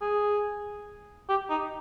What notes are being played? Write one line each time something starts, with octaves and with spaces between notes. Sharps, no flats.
G#4
G4
D#4